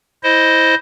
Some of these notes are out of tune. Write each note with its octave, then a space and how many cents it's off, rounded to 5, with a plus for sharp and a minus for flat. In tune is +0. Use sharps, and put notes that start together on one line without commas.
E4 -15 C5 +0 D#5 +0